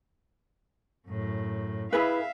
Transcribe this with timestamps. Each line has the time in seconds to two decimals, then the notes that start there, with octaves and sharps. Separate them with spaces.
1.08 F#2 A2
1.93 E4 G#4 B4 E5 F5